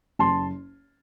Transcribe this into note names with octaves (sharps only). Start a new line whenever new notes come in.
F#1 A5 C6